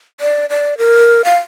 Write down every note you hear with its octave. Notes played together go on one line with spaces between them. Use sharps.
D5
D5
A#4
F5